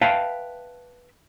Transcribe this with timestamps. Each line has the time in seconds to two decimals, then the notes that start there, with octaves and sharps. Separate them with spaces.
0.01 B4 E5 F5 G5 A5